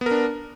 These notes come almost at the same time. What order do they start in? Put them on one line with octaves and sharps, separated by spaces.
B3 A#4 D4